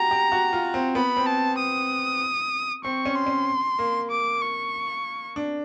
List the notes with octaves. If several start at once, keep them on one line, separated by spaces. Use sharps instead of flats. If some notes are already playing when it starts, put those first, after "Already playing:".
Already playing: F#4 G4 A#5
G4
F#4
F4
C4
B3 B5
C4
A5
D#6
C4 C#6
C#4
C6
C#4
A#3
D6
C#6
D4